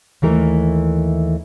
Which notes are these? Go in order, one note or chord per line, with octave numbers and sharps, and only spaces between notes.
D#2 E3 A3 A#4